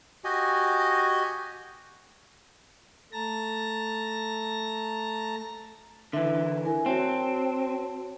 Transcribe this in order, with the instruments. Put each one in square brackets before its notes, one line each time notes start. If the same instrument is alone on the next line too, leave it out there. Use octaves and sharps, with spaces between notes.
[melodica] F#4 G4 D#5 G#5
[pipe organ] A3 A5 A#5 A#6
[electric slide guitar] D3 E3 [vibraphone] E5
[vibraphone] E4 A#4 G#5
[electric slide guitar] C4 [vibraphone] F#4 C#5 A5